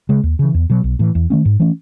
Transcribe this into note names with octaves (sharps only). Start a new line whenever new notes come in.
C#3 G#3
D#2
C#3 E3
E2
B2 F#3
B1
A2 E3
E2
D#3 A3 C#4
G#2
E3 A3 C#4